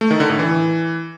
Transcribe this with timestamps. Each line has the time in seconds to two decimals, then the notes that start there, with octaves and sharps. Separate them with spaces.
0.01 A3
0.11 D#3
0.20 D3
0.30 A2
0.39 E3